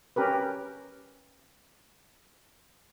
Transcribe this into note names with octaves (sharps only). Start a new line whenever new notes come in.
C#4 G4 A#4 B4